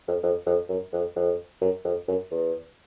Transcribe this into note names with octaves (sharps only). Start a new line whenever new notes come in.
F2
F2
F2
F#2
F2
F2
F#2
F2
F#2
E2